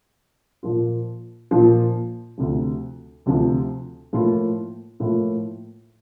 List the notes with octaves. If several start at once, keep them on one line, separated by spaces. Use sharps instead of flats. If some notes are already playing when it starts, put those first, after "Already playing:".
A#2 F3 A#3 F4
A#2 F3 A#3 F4
D2 C3 F3
D2 C3 F3
A2 F3 A#3 F4
A2 F3 A#3 F4